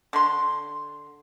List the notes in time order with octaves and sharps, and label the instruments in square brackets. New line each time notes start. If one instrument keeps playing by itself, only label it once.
[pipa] D3 C6